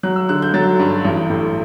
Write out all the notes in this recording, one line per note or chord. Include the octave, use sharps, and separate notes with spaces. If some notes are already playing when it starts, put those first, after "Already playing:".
F#3 F#6
E6
D3 F#6
G6
F#3 A6
G2
A1
A2